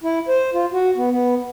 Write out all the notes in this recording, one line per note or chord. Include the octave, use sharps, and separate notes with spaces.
E4
C5
F4
F#4
B3
B3